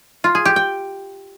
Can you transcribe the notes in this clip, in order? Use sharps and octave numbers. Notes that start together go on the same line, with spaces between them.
F4
G#4
G4
G5